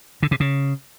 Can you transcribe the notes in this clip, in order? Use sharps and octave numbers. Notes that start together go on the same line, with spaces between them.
D3
C3
C#3